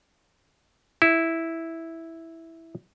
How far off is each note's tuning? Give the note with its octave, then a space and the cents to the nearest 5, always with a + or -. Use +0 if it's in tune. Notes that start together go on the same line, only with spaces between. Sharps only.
E4 -5